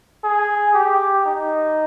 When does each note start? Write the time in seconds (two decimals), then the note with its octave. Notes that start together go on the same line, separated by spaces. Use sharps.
0.24 G#4
0.74 G4
1.25 D#4